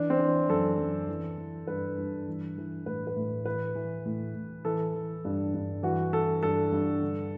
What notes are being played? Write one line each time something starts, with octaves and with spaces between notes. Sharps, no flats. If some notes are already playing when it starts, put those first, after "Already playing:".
Already playing: E3 D4
C4
E3
F#2 A4
F#2
E3
E3
G2 B4
G2
E3
E3
A2 B4
B4
A2
E3 B4
E3
A2
A2
E3 A4
E3
G2
G2
E3 F#4
E3 A4
G2 A4
G2
D3